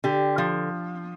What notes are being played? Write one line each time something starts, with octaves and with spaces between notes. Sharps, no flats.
D3 G4
F3